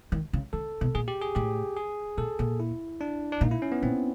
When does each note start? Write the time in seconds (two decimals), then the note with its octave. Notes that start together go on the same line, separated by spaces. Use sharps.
0.12 D#3
0.33 C#3
0.53 D3 A4
0.81 B2
0.95 A#2 G#4
1.08 G4
1.21 G#4
1.35 A2 G4
1.77 G#4
2.17 A#2 A4
2.39 A#2
2.60 E4
3.01 D4
3.32 D4
3.41 A#2 D#4
3.51 E4
3.62 C#4
3.72 B3
3.82 A#2 C4